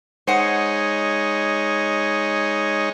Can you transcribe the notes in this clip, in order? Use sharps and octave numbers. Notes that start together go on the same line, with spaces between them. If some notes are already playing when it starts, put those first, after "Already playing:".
G#3 D#4 C5 C#5 F#5